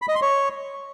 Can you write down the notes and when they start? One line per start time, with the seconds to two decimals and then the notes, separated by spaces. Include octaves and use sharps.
0.02 B5
0.08 D#5
0.15 C6
0.22 C#5